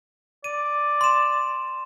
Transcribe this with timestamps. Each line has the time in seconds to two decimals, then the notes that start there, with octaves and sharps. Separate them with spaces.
0.44 D5 D#7
1.01 C6 E7